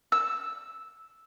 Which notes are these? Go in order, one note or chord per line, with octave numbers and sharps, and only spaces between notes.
E6